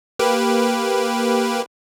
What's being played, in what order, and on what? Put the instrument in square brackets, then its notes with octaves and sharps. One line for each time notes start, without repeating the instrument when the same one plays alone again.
[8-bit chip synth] A#3 G4 B4